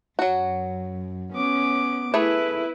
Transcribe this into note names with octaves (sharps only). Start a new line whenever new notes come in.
F#2 F#3 F#4
B3 C#4 D6
A3 E4 G#4 B4 B5